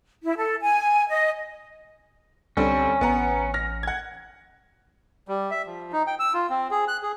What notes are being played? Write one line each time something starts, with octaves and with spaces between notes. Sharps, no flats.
E4
A4
G#5
D#5
C2 D3 G3 C4 C#4
A1 B3 F#5 A#5
F6 A#6
F#5 G#6
G3
E5
F3
D#4
G5
E6
F4
C4
G#4
F#6
G#4